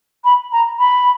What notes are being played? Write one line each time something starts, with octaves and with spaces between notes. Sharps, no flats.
B5
A#5
B5